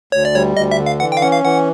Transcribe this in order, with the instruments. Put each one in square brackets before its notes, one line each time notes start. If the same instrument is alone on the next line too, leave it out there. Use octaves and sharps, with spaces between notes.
[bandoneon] D2 [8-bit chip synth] C#5
[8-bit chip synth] D5
[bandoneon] G3 [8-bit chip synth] C#5
[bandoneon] D2 [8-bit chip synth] D#5
[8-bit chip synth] E5
[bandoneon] D3
[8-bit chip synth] F5
[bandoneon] E3 [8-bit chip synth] F#5
[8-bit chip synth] G5
F5
[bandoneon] C#4 [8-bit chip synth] F#5
[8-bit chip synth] F5
[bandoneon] E3 [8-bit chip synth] F#5